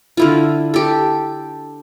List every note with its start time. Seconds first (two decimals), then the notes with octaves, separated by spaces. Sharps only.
0.17 D3 E4 F4
0.74 G4 A4